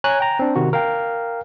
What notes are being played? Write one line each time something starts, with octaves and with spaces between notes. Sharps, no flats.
C#5 G#5 A#5 F#6
G5 A#5
C4 D4
C3 D#3 F#4
A#4 F5 G5